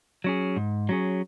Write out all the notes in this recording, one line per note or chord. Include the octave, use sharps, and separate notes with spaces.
F#3 C#4 G#4
G#2
F#3 C#4 G#4